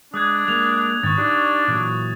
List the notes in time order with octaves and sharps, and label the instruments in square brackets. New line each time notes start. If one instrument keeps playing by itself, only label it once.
[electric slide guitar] G#3 [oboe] D4 [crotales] D#6 F#6 G#6
[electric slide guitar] G#3 A#3 [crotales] F7
[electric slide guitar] G#2 D#3 [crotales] C#6 F#6 A6
[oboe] D4 [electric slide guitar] D#4 G4 D5
[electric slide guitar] A#2 E3 F#3